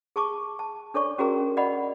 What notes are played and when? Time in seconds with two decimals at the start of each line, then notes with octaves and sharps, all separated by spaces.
0.16 G#4 A5 C#6 D6
0.59 A5
0.94 D4 A4 C#5 D5 C#6
1.18 C#4 F#4 G#4 A#4 A#5
1.57 D5 D#5 F#5 B5